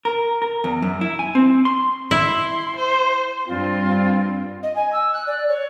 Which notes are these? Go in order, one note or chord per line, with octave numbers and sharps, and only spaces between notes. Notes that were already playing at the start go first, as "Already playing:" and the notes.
A#4
A#4
E2
F#2
E4
G#5
C4
C6
E4 C6
C5
G2 C4 F4
D#5
G#5
E6
F#6
D5
C#5